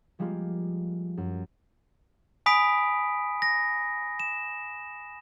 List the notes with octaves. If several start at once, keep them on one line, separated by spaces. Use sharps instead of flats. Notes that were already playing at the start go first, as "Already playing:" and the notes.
F3 G3 G#3 A#3 F4
F#2
G#5 B5 D#6 B6 D7
A#6
E7